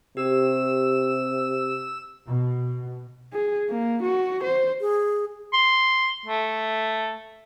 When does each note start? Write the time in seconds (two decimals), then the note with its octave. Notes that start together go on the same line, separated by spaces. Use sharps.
0.17 C3 G4 E6
2.27 B2
3.33 G#4
3.69 A#3
4.02 F#4
4.43 C5
4.81 G#4
5.53 C6
6.26 A3